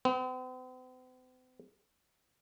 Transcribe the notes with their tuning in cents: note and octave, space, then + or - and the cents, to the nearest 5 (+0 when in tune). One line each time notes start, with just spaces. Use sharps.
C4 -45